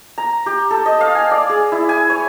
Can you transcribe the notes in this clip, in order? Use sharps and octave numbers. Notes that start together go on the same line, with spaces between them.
A#5
G4
A4
D#5
F5
G#5
D5
G#4
E4
G#5
C#5